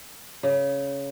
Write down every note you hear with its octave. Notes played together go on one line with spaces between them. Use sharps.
C#3